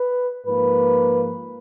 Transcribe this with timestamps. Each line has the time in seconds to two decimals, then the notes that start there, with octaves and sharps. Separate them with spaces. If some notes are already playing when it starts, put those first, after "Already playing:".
Already playing: B4
0.45 G#2 F3 A#3 B4